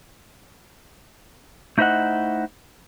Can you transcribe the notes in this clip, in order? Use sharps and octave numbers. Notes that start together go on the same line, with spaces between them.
A3 D#4 E4 C5 D#5 F#5